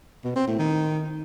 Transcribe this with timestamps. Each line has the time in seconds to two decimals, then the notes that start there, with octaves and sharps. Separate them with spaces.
0.24 B2
0.36 C4
0.47 A2
0.59 D#3